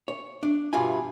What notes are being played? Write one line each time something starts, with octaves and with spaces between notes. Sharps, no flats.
C#5
D4
E2 G2 B2 E3 F4 G#5